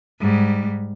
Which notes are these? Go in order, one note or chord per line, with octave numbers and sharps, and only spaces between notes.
G#2 G3